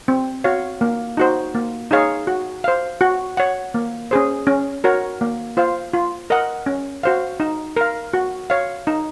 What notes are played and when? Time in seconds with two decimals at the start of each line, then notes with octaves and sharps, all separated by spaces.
0.08 C4
0.44 F#4 C#5 F5
0.81 A#3
1.17 D#4 F#4 C5
1.55 A#3
1.91 D#4 G#4 C#5 F5
2.27 F#4
2.64 C5 F5
3.01 F#4
3.37 C#5 F#5
3.74 A#3
4.11 C#4 G#4 C5
4.47 C#4
4.84 F#4 A#4 C#5
5.21 A#3
5.57 F4 C5 F5
5.93 F4
6.30 A#4 D#5 F#5
6.66 C#4
7.03 F#4 C5 F5
7.40 D#4
7.77 A#4 F5
8.14 F#4
8.50 C#5 F5
8.87 D#4